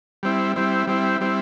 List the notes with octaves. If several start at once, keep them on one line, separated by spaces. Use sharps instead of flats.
G3 C4 E4
G3 C4 E4
G3 C4 E4
G3 C4 E4